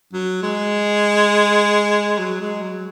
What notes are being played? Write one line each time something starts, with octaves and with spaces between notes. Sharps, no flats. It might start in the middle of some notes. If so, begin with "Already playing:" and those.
F#3
G#3
F#3
G#3
F#3